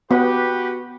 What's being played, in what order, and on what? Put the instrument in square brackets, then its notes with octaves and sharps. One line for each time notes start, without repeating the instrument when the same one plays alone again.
[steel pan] B3 [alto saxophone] F#4 [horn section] G4 B4